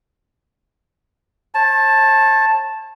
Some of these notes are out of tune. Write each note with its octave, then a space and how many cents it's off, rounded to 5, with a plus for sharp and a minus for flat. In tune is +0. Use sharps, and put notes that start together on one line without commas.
C#5 -45 A5 +0